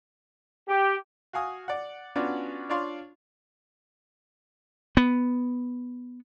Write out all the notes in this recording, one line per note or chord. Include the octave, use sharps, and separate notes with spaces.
G4
F#4 F5 G#5 D#6
D5 F#5
B3 C#4 D4 F4 F#4 D5
D4 F4 C#5 D5 F5 C6
B3